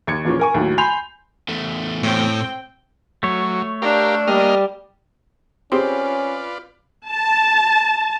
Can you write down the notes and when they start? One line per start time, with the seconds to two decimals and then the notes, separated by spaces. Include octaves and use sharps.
0.07 D#2 G#6 C#7
0.25 E2 A#2 F3 C#4
0.39 A#4 G#5 C#6
0.54 D#2 A2 F#3
0.78 G#5 B5 C6 G6 C7 F7
1.48 E2 A3
2.03 A2 C4 G5
3.23 F#3 A3 C#5
3.82 D4 G4 A#4 F5
4.27 G3 A#3 D#5 F6
5.72 C4 C#4 F4 G4 G#4 B4 D5 C6
7.09 A5